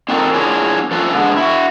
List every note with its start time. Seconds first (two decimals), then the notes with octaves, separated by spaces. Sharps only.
0.09 C4 D#4 F4 F#4 A4 A#4
0.34 B3 D4 E4 F4 G#4 C#5
0.91 F3 C#4 F4 A4 B4 F5
1.13 D3 G#3 B3
1.36 E4 F#4